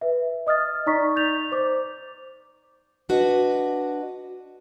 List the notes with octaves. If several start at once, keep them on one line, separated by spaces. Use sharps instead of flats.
B4 E5
D#5 D#6 F6 A6
D#4 D5 A#5 C#6 B6
G6 A6 F7
C5 D6
D4 F#4 B4 D#5